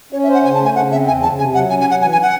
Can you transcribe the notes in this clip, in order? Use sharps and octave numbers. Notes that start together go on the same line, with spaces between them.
C#4 C#5
E5
C5
F#5
C#3 G#5
A5
A3 G#5
C#3 F#5
C4 E5
E2 G#5
C#3 A5
C3 G#5
F#3 F#5
C#4 G#5
G#5
F#3 F#5
E3 G#5
G#5
F#5